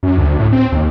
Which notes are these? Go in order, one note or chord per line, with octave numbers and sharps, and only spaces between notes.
F#2
D2
A2
C4
D#2